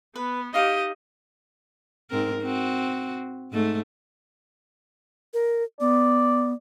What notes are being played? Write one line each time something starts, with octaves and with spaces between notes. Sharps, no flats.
B3 B4
D#4 G4 D#5 F5 D6
G#2 C4 A#4
C4 F#4
G#2 A3
A#4
B3 D5